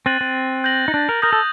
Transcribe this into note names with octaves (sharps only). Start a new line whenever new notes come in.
C4 F#6 A6 D#7 F#7
C4
G6 A#6 F#7
D#4
D4
A#4
A#4 D#6 G6 A#6
A4